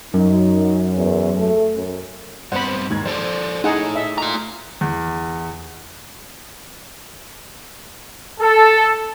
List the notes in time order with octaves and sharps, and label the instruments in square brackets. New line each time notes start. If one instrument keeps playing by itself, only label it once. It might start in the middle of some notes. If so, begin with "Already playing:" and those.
[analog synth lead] F#2 [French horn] D#4
[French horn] E2
A3
F#2
[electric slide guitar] G2 B3 C4 [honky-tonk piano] C5 [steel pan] F#5 B5
[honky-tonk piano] D#2 G#2 G#6
[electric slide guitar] F3 A4 D5 [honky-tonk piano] C5
[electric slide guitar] A3 E4 [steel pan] D#4 G#4 F#5
[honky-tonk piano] D#4 [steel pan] E5
[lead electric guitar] F4 A#5
[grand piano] E2
[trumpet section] A4